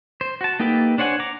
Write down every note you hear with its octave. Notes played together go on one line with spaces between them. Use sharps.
C5
F#4 A5
A#3 D#4 G4 A4 B4
D4 C5 C#5 F#5 G#5
A#5 D6